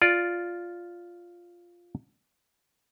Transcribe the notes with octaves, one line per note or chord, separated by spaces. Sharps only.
F4 D5